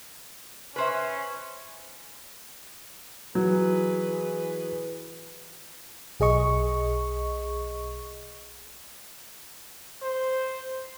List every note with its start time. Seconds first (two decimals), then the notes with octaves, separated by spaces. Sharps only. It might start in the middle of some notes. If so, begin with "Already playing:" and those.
0.76 C#4 B4 C5 E5
3.35 E3 F#3 G#4 B4
6.20 B1 G#4 D#5 C#6
10.02 C5